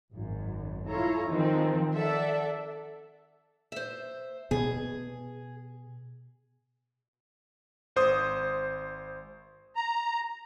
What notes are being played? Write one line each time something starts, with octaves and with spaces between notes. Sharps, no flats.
G#1 F#2
E4 F4 A4 C#5 A#5
D#3 F3 G#3 C4 D#4
A4 D5 E5 F#5
C5 E5
B2 B3 G#4
G#1 C5 D#6
A#5